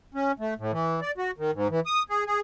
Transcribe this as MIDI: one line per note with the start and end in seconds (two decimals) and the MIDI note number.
0.14 0.32 61
0.39 0.54 57
0.59 0.72 45
0.72 1.00 52
1.02 1.11 74
1.18 1.31 66
1.38 1.51 51
1.53 1.68 44
1.70 1.80 52
1.86 2.03 87
2.10 2.24 68
2.26 2.40 68